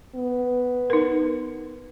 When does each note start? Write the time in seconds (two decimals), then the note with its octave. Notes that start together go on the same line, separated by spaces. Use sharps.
0.15 B3
0.90 D#4 A#4